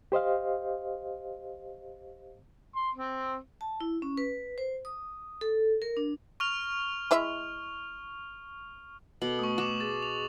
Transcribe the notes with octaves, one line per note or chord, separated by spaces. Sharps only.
G4 C5 D#5 F5
C6
C4
A5
E4
C#4
B4
C5
D#6
A4
A#4
D4
C#6 F6 F7
G#3 E4 E5
B2 A4 D6 F#7
A3 C#6 D#6
F#4 C#6 D6 E7
G#4 A6
F7